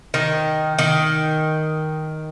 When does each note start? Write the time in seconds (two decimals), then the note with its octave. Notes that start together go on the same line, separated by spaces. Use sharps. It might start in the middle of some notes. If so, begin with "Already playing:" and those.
0.14 D#3
0.79 D#3